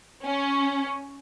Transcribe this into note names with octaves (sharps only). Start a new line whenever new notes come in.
C#4